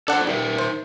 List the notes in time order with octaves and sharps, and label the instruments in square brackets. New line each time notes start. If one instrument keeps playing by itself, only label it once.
[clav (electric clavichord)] D4 F#5 [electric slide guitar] A4 C5
[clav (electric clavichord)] G3 [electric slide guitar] D#4 A#4 E5
[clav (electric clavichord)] C5